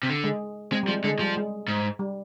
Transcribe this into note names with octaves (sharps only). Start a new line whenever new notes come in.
C3
D3
G#3
G#3 C4
G3
F3 G#3
D3 G#3
F3 G3
G#3
G#2
G3